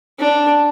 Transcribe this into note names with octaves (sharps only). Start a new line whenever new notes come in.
D4